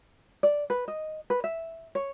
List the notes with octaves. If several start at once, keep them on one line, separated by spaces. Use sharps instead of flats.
D5
B4
D#5
B4
E5
C#5